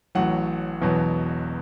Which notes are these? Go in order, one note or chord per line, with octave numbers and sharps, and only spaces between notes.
A1 A2 F#3 F#5
E1 E2 B2 F#3